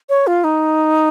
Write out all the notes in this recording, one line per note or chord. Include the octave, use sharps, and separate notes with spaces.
C#5
F4
D#4